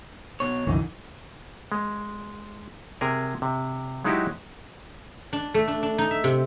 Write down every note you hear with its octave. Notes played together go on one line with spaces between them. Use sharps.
B2 C#5
C2 F#2 D3 E3 D#4
G#3
C3 G#4 A#4
C3
F#3 G#3 D#4 E4 F#4 G4
D4
A3
D4
D4
D#4
E5
C3